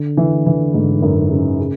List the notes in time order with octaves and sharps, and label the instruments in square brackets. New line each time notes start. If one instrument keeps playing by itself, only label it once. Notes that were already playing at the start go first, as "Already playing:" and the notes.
Already playing: [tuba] D3
[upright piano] E3
E3
G#2
F#2
C#3
C#3